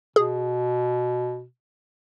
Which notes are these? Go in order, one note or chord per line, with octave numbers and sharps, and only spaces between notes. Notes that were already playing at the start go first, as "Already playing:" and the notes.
B2 G#4